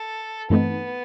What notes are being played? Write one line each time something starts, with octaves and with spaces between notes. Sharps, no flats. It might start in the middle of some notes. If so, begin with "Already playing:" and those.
Already playing: A4
G2 E3 A3 B3 C4 D#4